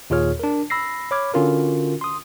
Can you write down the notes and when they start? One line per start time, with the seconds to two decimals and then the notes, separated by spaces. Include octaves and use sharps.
0.10 D#2 A#2 F4 G#4 C#5 F6
0.39 D4 A#4
0.70 B5 E6 A#6 C7
1.11 C#5 B5 D6 F6 G#6
1.34 D3 C#4 F4 F#4 A#4
2.01 C6 D#6